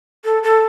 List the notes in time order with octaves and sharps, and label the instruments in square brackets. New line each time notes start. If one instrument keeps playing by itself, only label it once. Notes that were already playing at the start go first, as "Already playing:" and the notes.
[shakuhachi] A4
A4